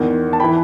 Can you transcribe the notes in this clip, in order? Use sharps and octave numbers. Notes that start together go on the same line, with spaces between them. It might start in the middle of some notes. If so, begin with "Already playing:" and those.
Already playing: E2 D#3
A5
E3 G5 B5